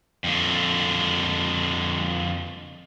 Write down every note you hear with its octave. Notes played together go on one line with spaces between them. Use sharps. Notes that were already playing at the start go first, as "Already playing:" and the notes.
F2 D3